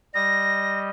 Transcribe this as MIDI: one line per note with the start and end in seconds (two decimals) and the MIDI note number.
0.14 0.90 55
0.14 0.90 75
0.14 0.80 94